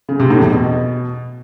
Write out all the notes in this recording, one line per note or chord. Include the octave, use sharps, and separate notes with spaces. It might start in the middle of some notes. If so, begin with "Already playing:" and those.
C#3
C3
A2
E2
B2